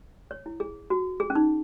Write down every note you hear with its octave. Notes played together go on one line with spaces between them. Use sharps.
C#5
E4
G#4
F#4
G#4
C#4
D#4